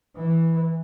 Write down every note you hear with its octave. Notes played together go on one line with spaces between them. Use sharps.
E3